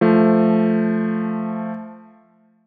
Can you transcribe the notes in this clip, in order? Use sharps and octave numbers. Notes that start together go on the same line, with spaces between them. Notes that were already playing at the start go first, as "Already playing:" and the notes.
F3 A3